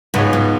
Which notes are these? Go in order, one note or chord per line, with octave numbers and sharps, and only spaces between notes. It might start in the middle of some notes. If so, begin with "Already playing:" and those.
C#2 G#2 B2 B3 G#4 C#5
G#2